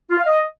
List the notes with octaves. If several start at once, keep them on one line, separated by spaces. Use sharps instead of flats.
F4
F5
D#5